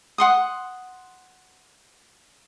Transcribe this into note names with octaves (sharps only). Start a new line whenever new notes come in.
F#5 C6 D#6